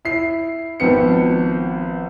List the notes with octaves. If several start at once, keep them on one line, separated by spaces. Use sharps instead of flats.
E4 C7
G#1 F3 B3 C4 C#7